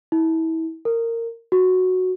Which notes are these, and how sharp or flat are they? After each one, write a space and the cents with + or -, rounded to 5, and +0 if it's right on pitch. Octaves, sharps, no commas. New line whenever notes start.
E4 -30
A#4 -20
F#4 -5